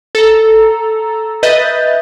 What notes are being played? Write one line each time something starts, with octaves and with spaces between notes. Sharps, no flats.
A4 A#5
B4 D#5 E5 G6 A6